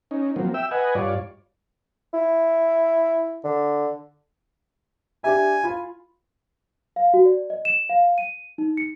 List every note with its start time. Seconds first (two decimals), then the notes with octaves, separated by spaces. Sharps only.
0.11 C#4 D#4
0.36 F3 F#3 A#3 C4
0.54 E5 G5 E6
0.71 B4 D#5 F#5 G#5
0.95 G2 F4 C#5 D5
2.13 E4
3.44 D3
5.24 D4 G4 E5 G#5
5.64 F4 B5
6.96 F5
7.14 F#4
7.26 D5
7.50 D#5
7.65 E7
7.89 F5
8.18 D#7
8.58 D#4
8.77 C#7